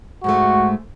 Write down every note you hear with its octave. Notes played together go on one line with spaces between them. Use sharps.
G#2 G#3 A3 F#4